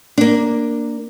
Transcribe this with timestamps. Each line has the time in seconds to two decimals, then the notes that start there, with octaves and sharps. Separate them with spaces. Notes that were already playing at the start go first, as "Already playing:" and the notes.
0.18 A#3 D4